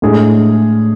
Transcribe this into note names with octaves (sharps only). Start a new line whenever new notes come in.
A2 G#3 D4 G#4